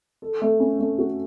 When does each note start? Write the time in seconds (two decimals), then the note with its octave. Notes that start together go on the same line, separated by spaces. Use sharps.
0.22 A4
0.42 A3
0.60 C#4
0.79 A3
0.99 F#4